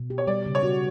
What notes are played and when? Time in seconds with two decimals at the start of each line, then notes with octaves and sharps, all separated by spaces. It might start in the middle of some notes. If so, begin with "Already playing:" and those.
Already playing: B2
0.10 G4
0.18 C#5
0.27 G3 D5
0.46 C#3
0.55 C#5
0.63 F#4